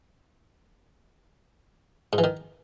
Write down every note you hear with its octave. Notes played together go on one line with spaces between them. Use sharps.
G#2
E3
D#3